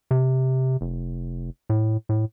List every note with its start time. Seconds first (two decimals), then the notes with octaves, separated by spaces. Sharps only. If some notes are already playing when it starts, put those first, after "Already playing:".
0.11 C3
0.81 F1
1.70 A2
2.09 A2